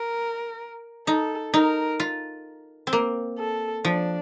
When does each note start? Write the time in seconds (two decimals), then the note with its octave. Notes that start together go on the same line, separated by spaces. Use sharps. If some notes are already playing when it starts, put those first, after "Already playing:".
Already playing: A#4
1.07 D#4 A4
1.54 D#4 A#4
2.00 F4
2.87 C4
2.93 A#3
3.39 A4
3.85 F3 D4